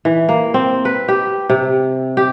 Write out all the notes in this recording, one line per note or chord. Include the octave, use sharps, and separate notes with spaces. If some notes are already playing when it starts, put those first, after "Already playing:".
E3
A#3
C4
B4
G4
C3
G4